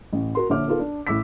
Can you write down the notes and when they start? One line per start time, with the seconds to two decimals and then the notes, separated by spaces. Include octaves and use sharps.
0.13 A1
0.35 F#4 A#4 C6
0.49 A#1 D3 C#5 E5 D6 F6
0.68 B3 D#4 F4 A4 A#4
0.80 D4
1.07 A1 A2 D6 E6 B6